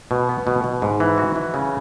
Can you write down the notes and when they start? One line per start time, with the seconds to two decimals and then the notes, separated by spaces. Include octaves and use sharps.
0.11 B2
0.29 B3
0.47 B2
0.64 B2
0.82 G#2
1.00 E3
1.18 F#4
1.36 E3
1.54 C#3